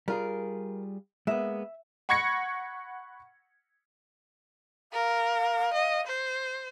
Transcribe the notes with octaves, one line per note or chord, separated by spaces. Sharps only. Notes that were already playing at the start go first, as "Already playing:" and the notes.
G3 F4 G#4 A#4
G#3 A#3 B3 E5
F#5 B5 C#6 G#6 A#6 C#7
A#4 F5
D#5
C5